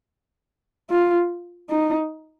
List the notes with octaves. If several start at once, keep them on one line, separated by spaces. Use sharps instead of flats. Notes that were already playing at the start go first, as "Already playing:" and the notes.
F4
D#4